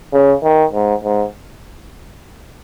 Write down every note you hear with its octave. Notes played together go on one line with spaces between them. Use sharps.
C#3
D#3
G#2
G#2